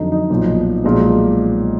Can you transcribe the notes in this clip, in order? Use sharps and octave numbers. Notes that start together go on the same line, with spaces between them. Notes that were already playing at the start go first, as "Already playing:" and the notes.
Already playing: F2 D3 F#3 D4 D#4
D#4
B1 A#2 F3
B1 A#2 F3 G#3